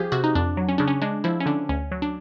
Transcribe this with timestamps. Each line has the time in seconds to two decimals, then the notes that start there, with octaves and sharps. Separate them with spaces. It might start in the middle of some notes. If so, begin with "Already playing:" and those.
Already playing: C2 F3 G4 G#4
0.12 C3 F#4
0.24 D#4
0.35 F2 D4
0.57 F#3
0.69 C#4
0.78 C#3 D4
0.88 C#4
1.02 G#3 D4
1.24 F3 E4
1.40 C#4
1.46 D3 D4
1.69 D2 C#4
1.92 F#3
2.02 D4